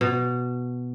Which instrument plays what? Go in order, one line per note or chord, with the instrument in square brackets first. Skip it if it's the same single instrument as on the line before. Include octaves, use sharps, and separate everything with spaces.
[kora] B2